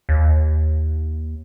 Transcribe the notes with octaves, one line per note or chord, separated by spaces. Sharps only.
D#2